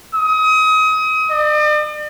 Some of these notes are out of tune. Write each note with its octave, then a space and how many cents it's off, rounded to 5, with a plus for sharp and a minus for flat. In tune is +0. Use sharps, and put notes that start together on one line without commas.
D#6 +30
D5 +45